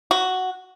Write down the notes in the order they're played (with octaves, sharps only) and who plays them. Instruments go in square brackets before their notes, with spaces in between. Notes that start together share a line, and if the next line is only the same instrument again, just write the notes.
[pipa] F#4